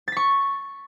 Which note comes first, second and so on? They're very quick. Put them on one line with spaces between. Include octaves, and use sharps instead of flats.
A6 B6 C#6